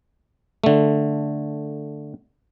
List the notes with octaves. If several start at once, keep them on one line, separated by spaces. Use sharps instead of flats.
D3 A3